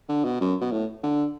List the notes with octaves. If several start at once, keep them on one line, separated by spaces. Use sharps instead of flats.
D3
B2
F#2
B2
A2
D3